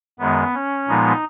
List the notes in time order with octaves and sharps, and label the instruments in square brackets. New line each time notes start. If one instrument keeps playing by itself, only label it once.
[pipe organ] F#2 D#3 G#3 B3
C#4
A#2 F3 G#3 B3 D#4